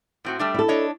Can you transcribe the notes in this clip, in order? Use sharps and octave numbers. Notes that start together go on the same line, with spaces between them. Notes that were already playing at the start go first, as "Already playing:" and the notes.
A2 C4 F#4
G3 A3 D4
E4 A4
D4 C#5 D#5